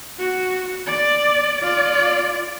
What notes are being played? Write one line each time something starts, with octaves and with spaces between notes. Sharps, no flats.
F#4
D5
F4 D5